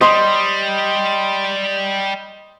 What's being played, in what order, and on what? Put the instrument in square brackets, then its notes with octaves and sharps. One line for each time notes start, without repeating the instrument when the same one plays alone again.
[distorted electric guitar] G3 [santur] D#5 C6